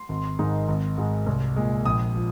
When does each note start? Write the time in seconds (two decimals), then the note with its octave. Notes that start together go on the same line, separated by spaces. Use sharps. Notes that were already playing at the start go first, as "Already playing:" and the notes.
Already playing: C6
0.09 G#1
0.39 G#2 D#3 G#3 D#4
0.68 G#1
0.98 G#2 G#3
1.27 C2
1.56 A#2 G#3
1.85 A#1 D#6
2.15 F3